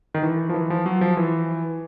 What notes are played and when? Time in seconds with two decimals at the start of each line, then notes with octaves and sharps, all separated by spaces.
0.14 D#3
0.23 E3
0.49 F3
0.54 E3
0.70 F3
0.86 F#3
1.01 F3
1.17 E3